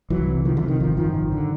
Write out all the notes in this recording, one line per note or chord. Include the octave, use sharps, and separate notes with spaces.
C2 E3 F#3
C3
C3 D#3 F3
D3 E3
C3
D#3
G#1 D#3 F3
F#2 D#3 F3
G#1
D3